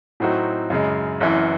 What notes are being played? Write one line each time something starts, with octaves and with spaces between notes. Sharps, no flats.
A2 F#3 C4 D#4 F#4
F#2 C#3 G#3
F#1 F#2 E3